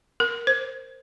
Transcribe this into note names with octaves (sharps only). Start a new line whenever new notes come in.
A#4
C5